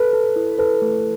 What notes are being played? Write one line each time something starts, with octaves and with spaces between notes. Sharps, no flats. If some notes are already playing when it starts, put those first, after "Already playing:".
Already playing: A4 B4
A4
E4
A4 B4
A3